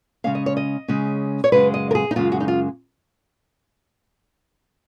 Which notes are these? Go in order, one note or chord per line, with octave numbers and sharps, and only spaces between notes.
C#3 G#3 C#4 F5
D#5
C#5
D#5
C#3 G#3 C#4
C#5
F#2 C#3 G#3 B4
D#5
A#4
G#4
D#4
F#2 C#3 G#3 F4
F#4
D#4
F4